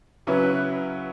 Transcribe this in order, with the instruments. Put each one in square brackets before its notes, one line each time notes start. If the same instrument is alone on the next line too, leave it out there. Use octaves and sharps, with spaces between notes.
[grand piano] C#3 F#3 C#4 E4 [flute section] B4